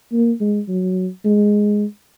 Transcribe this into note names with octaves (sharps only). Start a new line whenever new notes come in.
A#3
G#3
F#3
G#3